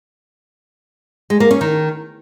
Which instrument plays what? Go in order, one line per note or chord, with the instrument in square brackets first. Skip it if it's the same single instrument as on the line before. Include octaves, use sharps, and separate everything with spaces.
[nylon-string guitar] G#3
A#3
C#4
D#3